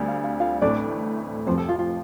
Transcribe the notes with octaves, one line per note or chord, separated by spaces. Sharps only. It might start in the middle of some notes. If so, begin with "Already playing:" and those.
Already playing: D2 D3 G3 C4
F5
F5
F4 F5
A1 A2 A3 C4 D4 D5
F1 F2 F3 C4 C5
A4
F4
F4